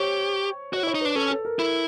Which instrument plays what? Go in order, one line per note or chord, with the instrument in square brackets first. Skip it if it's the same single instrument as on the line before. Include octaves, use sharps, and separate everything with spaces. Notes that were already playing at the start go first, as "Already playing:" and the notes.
Already playing: [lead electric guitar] G4 [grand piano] C5 C#5
[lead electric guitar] F#4 [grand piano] C#5
[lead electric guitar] E4
[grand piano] C#5
[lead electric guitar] D#4
[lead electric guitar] D4 [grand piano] B4
[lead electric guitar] C#4 [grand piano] A4
[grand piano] A4
A#4
[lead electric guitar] E4 [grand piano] A#4